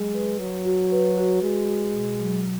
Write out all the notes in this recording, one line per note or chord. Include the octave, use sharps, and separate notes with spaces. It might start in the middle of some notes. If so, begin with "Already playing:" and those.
Already playing: F#3 G#3
B4
F#3 F#4
F#4
B4
F#4
G#3 F#4
F#4
B2
F#3